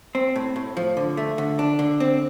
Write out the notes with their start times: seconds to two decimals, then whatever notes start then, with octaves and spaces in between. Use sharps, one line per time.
0.15 C4
0.36 A2
0.56 A2
0.77 F3
0.97 D3
1.17 A3
1.38 D3
1.59 D4
1.79 D3
2.00 C4